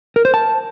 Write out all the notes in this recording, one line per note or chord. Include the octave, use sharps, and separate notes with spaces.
A#4
C5
A5